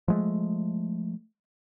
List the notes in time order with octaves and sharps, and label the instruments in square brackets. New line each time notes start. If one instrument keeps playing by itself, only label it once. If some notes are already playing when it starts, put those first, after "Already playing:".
[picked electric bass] F3 G#3 A3